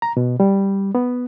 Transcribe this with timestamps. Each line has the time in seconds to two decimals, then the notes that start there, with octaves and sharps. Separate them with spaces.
0.02 A#5
0.17 B2
0.40 G3
0.95 B3